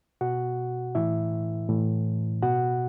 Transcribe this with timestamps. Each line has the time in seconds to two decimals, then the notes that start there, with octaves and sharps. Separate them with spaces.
0.21 B2 F#4 F#5
0.95 A2 E3 E4 E5
1.69 A2 E3
2.42 B2 F#4 F#5